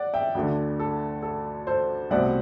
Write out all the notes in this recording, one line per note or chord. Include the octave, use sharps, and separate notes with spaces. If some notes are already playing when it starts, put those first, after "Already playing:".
Already playing: D5 F#5
E5 G5
D2 D3 A3
A4
A4
A4 C5
C2 B2 A3 C4 E4 D5 F#5